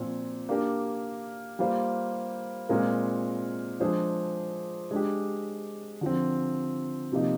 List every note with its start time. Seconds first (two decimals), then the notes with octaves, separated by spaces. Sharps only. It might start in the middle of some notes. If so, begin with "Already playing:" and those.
Already playing: A#2 F3 C4
0.49 A#3 D4 G4 A#4
1.59 G3 A#3 F4 C5
2.69 A#2 G#3 C4 F4 A#4
3.80 F3 G#3 D4 G#4 C5
4.91 G#3 D4 G4
6.01 D3 F3 C4
7.12 C3 F3 A#3 D#4